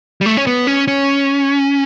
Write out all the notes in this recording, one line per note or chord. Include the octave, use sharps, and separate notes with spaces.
G3
A3
C#4
B3
C#4
C#4